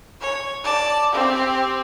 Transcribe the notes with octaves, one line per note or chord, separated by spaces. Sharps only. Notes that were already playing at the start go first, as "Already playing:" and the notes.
C#5
D5 A5
C4 G4